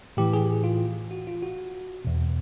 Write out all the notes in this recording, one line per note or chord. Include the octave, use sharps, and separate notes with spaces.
A2 E3 G4
G#4
F4
F#4
F4
F#4
E2 B2